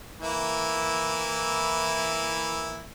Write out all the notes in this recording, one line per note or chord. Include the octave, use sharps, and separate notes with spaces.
E3 A#3 E4